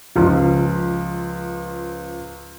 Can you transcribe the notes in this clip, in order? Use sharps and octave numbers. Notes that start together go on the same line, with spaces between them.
C#2 F3